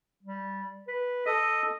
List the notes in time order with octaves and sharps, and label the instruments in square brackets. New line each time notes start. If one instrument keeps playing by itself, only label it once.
[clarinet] G3
B4
[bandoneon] A4 [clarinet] D#5